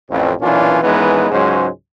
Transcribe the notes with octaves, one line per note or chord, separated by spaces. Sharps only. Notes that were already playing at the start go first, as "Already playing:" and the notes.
A1 F2
B1 A#2 E3 C#4 D4 F4
A#1 E3 G#3 B3 C#4 D#4
C#2 G#2 F#3 G#3 C#4 C5